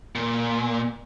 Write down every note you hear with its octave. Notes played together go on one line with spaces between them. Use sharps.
A#2